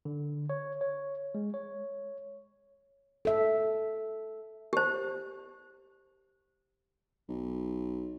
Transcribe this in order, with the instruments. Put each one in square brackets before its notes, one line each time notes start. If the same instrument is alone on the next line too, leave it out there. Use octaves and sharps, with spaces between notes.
[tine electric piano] D3
C#5
C#5
G#3
C#5
[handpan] A4 E5
[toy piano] G4 C5
[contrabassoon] B1